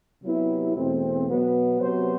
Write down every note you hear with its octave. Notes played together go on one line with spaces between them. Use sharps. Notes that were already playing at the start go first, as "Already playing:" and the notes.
C3 F#3 B3 E4 G4
E2 B2 A3 C4
B2 F#3 B3
C3 F#3 B3 F#4 C5